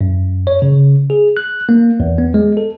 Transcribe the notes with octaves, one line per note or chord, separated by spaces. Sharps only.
F#2
C#5
C#3
G#4
F#6
A#3
E2
B3
G#3
A4